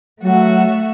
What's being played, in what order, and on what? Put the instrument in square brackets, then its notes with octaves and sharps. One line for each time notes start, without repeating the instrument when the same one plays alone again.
[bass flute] F#3 [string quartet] A3 F#4 E5